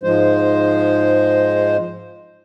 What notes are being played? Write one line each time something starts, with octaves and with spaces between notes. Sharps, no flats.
G#2 F3 G#3 C5